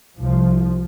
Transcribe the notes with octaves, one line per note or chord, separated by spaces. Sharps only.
C2 F3